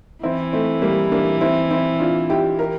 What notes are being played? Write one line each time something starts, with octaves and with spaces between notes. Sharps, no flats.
E3 C4 E4
A3 C4
G3 A#3
A#3 D4
C4 E4
C4 E4
D4 F4
E4 G4
G4 A#4